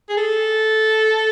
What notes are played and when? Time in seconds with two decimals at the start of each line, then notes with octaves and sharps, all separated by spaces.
0.09 G#4
0.17 A4